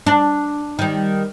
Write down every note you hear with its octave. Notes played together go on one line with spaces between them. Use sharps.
D4
D#3 G3